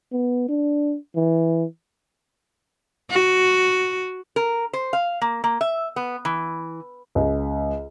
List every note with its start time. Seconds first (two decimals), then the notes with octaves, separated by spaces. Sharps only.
0.12 B3
0.48 D4
1.15 E3
3.11 F#4
4.36 A#4
4.73 C5
4.93 F5
5.22 A#3
5.44 A#3
5.61 E5
5.96 B3
6.25 E3
7.15 C#2